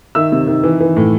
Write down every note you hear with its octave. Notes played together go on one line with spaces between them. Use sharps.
D#3 E5 E6
C3
D#3
E3
E3
A2